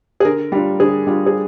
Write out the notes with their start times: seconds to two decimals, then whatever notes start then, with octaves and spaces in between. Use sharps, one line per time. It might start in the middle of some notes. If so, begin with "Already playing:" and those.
0.20 G#4
0.25 D3 A#4
0.52 G3 D4 F4
0.80 D3 G#4
1.07 G3 D4 F4
1.26 G#4